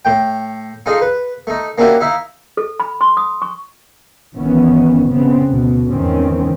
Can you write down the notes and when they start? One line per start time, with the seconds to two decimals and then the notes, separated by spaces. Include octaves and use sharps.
0.05 A2 G5
0.86 D#4 F4 G#4 A4 D#5
1.01 B4
1.47 A3 D#4
1.78 A#3 C#4 D4 E4 F#4 G4
2.00 D#4 E4 E5 F5
2.57 A4
2.80 B5
3.01 C6
3.17 D#6
3.42 C#6
4.34 G1 D#3 E3 B3 C#4
5.09 C#3 B3 C4
5.46 D2 B2
5.92 E2 G#2 D#3 E3 C4 C#4